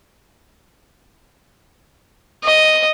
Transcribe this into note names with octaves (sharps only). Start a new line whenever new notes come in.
D#5